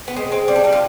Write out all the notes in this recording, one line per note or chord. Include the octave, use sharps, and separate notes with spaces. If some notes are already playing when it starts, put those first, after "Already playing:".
B3
G#3 C4
G#3 C4
G3 C4
D4
G3 D#4
F4